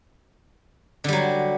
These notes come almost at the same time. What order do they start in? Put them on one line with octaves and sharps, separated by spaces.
D3 G3 F#3